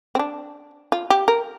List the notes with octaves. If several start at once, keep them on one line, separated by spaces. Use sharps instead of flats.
C4
D4
F4
G4
A#4